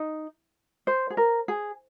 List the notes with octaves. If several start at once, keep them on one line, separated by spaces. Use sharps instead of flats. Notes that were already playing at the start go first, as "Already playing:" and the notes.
Already playing: D#4
C5
G#4
A#4
G#4